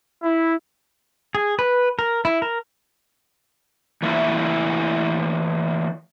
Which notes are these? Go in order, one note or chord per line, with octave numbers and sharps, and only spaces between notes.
E4
G#4
B4
A#4
E4
A#4
E3 A3 A#3 E4